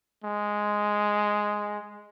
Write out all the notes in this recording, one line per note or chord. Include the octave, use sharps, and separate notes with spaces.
G#3